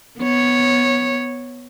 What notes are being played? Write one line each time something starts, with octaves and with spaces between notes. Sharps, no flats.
B3 C#5